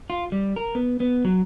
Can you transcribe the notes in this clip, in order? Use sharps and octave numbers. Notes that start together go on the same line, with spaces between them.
F4
G3
A#4
B3
B3
F#3